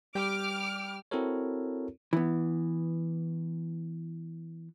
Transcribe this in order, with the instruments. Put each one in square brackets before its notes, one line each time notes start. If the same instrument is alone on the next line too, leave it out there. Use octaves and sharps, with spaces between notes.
[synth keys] G3 G5 [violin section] D6 F6 D7
[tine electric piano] C4 E4 F#4 A4 A#4 C#5
[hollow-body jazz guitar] E3 B3